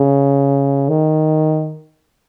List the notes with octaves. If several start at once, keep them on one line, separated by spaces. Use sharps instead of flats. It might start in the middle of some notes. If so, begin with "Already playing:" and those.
Already playing: C#3
D#3